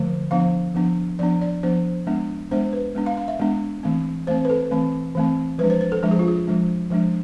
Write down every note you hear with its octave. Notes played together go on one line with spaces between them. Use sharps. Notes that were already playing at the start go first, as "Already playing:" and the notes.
Already playing: D3 F3 A3
F3 B3 D4 F5
F3 B3 D4
F3 B3 D4 D5
D5
F3 B3 D4 C5
G#3 B3 D4
G#3 B3 D4 C5
B4
G#3 B3 D4
F5
F5
E5
G#3 B3 D4
E3 A3 C4
E3 A3 C4 C5
B4
A4
E3 A3 C4
E3 A3 C4
F3 G#3 D4 B4
C5
C5
A4
F3 G#3 D4 A4
G#4
F4
G#4
F3 G#3 D4
F3 G#3 D4